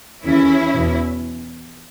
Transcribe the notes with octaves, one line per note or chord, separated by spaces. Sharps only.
D#2 C#3 E3 C#4 E4
E2 B2